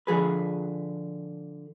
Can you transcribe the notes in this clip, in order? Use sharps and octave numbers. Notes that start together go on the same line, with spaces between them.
D3 F3 G#4 B4